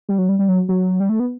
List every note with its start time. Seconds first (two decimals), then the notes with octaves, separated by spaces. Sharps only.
0.09 G3
0.18 F#3
0.29 G3
0.39 G3
0.48 F#3
0.69 F#3
1.00 G3
1.09 A3
1.20 B3